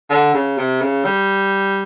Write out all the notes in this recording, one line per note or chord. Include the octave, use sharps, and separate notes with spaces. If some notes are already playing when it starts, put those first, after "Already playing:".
D3
C#3
C3
C#3
G3